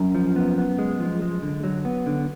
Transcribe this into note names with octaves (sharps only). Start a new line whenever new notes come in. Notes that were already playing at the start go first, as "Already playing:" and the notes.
Already playing: F#2
F3
B3
B3
G#3
F3
G#3
D3
F#3
B3
D3